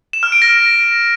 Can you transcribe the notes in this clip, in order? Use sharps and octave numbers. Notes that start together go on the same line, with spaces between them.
E7
F6
D7
A#6